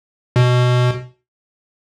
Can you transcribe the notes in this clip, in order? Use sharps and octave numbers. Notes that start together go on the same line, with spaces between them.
B2